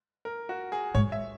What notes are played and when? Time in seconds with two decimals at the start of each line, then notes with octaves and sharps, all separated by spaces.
0.25 A#4
0.49 F#4
0.72 G#4
0.95 G#2 C#5
1.12 E5